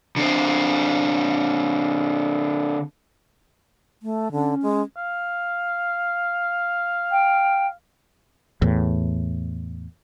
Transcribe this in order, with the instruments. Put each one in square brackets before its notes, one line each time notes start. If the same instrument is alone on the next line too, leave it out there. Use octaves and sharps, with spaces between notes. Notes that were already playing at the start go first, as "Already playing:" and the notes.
[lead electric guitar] D3 C4
[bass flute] A3
[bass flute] D3 [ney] C#4
[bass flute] G#3
[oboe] F5
[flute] G5
[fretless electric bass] E2 A2